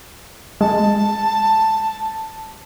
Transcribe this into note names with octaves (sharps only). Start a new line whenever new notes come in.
G#3 A5